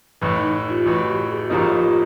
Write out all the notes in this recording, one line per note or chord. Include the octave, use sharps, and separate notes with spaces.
A1 A2 E3
D#4
F4 G4
A1 A2 E3 E4 F#4
F4 G4
F#4 G#4
A1 A2 F3 A#3 D#4 F4 G4
F4 G4
F4 G4